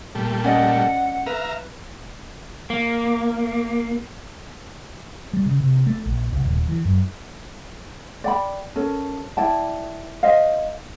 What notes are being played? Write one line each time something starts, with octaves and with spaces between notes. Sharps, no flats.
A#2 G3 A3
C#4 D5 D#5 F#5
B4 E5 F5 A#5
A#3
G3
C#3
C3
A3
A#1
C2
D#1
E3
F#2
D5 G5 B5
C#4 A4 A#4
E4 D5 G5 A5
C5 D#5 F5